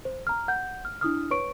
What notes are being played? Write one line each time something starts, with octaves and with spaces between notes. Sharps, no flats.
C5
A#5 F6
F#5 G6
F6
D4 E4 D#6 F6
B4 C#5 C#6 D7